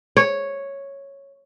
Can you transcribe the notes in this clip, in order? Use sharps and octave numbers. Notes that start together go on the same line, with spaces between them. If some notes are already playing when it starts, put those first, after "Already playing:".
C#5